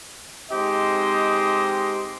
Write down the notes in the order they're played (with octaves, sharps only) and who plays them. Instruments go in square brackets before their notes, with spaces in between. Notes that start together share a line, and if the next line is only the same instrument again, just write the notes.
[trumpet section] G#3 C4 D#4 G4 C5 D#5